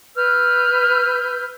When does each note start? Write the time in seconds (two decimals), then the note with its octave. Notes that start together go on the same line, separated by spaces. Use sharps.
0.16 B4 E6 F6 G6